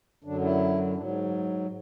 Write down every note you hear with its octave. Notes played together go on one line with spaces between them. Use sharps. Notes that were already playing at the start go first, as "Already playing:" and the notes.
F#2 D3 F#3 D4
E4
G#2 F#3 D4